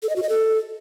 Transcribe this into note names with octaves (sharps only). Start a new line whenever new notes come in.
A4
D#5
F#4
D#5
A4